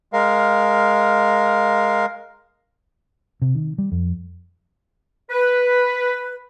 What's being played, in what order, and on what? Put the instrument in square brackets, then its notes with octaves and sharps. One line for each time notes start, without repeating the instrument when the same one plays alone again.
[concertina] G#3 A#4 F5
[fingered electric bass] C3
D#3
G3
F2
[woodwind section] B4